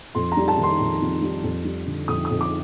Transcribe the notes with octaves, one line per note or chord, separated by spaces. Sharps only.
F2 C6
A#5
G3
A5
D#3
C6
F2
F2
G3
F2
G3
D3
F2 D#6
D#6
F2
D6